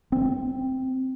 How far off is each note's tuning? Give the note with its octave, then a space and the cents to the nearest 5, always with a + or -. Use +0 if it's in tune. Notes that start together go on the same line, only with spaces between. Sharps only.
C4 -5